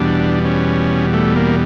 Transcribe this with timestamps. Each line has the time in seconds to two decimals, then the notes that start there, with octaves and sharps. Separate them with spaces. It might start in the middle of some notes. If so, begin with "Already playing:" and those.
Already playing: E2 B2 G3 D4
0.45 C#4
1.14 A3
1.36 A#3